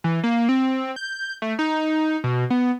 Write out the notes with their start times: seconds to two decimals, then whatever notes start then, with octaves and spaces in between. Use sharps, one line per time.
0.04 E3
0.24 A#3
0.49 C4
0.96 G6
1.42 A3
1.59 D#4
2.24 B2
2.50 B3